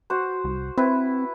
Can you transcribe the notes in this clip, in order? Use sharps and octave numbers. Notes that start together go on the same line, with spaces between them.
F#4 C5
C2
C4 E4 B4